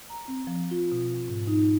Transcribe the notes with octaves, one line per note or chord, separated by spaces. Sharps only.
A#5
C4
F3
F4
B2
G#2
D#4